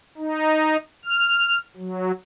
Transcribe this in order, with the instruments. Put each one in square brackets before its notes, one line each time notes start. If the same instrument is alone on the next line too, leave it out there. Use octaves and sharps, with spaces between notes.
[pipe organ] D#4
F6
F#3